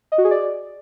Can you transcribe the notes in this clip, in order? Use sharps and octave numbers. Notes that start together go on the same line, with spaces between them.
D#5
F#4
G#4
D5